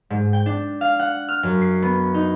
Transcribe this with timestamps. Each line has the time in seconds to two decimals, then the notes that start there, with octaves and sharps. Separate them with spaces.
0.10 G#2
0.33 G5
0.46 D4
0.81 F5
0.99 F#5
1.29 F6
1.43 F#2
1.61 C7
1.82 B3
2.14 D#4